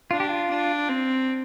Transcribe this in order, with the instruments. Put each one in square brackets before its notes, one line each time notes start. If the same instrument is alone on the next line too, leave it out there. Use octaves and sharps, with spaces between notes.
[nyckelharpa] D4 [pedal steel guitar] F4
[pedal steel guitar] G4
F4
[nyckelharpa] D4
C4